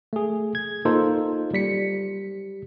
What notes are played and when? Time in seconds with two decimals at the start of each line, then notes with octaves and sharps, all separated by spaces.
0.13 A3 G#4
0.55 G#6
0.85 A#3 D#4 F4 A4 C5
1.53 G3 B6 C#7